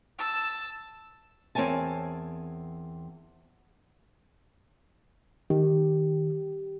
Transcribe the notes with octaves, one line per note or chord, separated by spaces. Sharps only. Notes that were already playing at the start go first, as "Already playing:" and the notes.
A5 E6
E2 C4 A#4 C#5 G#5 A5
D#3 G4